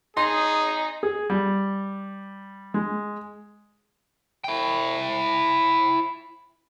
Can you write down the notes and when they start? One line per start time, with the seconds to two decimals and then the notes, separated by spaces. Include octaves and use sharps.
0.17 D#4 G#4 C6
1.03 G#4
1.30 G3
2.74 G#3
4.44 E4 G5